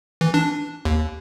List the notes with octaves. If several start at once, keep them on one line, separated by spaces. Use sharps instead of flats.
E3
D4
D#2